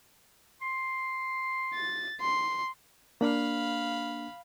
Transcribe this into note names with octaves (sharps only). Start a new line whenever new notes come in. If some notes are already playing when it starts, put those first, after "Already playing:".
C6
A6
C6
A#3 D4 F5 B5